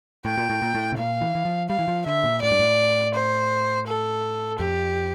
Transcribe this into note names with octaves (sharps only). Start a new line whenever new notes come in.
A2 G5
A#2
A2
A#2
A2
C3
A#2 F5
E3
E3
F3
G3 F5
E3
F3
D3 E5
A#2
A2 D5
G2
A2
C5
A4
F2 G4